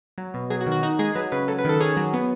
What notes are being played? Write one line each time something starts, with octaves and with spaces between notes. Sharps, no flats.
F#3
B2
F#3 G#4
F#4
D#3
F#4
D#4 F#4
G#3 G#4
F#3 B4
C#3 B4
F#3 A4
B4
D#3 A4
C#4 G#4
F#3
B3